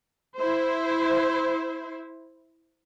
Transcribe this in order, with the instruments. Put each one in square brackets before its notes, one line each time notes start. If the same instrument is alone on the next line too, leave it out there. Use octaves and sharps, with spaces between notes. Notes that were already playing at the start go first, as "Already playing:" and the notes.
[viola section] E4 C5